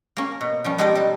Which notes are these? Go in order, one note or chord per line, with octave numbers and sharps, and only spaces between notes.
A#3 C#4
B2
F3 G3 C#4
B2 G#3 D#4 G4 D5 D#5
G3 A4